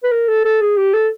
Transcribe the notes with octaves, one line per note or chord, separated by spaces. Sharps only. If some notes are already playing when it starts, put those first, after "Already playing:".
B4
A#4
A4
A4
G#4
G4
A4